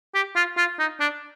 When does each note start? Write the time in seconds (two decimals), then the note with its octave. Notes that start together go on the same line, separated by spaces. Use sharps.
0.15 G4
0.36 F4
0.57 F4
0.79 D#4
1.00 D4